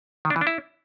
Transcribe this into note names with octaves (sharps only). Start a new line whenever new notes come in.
D#3
D4
E3
D4
E4